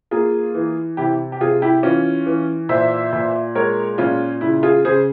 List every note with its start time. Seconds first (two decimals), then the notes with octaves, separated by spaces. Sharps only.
0.11 A#3 F4 G#4
0.55 E3
0.97 C3 E4 G4
1.32 G4
1.40 C3 F4 G#4
1.62 E4 G4
1.83 E3 C#4 F4
2.26 E3
2.69 A#2 C5 E5
3.13 A#2
3.55 G#3 A#4 C#5
3.98 A#2 C#4 F4
4.41 C#3 E4
4.63 F4 G#4
4.85 C#3 G#4 C5